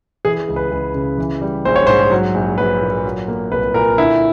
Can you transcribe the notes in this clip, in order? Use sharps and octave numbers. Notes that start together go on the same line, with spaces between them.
E3 G#4
C#2
B4
C#2
C#3
E3
G3
A#1 C5
C#5
G#2 C5
F#3
A#1
A#1 B4
A#2
F#3
A#3
C2 B4
A#2 A#4
D3 E4